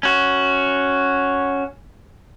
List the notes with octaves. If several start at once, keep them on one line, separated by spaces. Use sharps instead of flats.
C#4 F#4